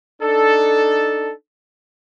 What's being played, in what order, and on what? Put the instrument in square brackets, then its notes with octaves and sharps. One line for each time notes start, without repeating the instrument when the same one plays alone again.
[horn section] D4 D#4 A4